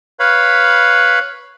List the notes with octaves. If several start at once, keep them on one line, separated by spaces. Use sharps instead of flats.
B4 C#5 F5 B5